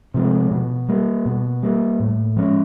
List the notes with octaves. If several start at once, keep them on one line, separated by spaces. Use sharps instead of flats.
C3 F3 G#3
B2
G3 A#3
B2
G3 A#3
A2
F3 G#3 C#4